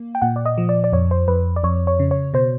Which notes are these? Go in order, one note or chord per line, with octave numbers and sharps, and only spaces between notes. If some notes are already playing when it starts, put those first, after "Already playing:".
Already playing: A#3
G5
A#2 F#5
D5
D#5
F3
D5
D5
F2 C#5
C5
F2 B4
D5
F2 C#5
C#5
C#3
C#5
B2 C5